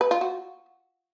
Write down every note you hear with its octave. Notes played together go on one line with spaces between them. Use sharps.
B4
F4
F#4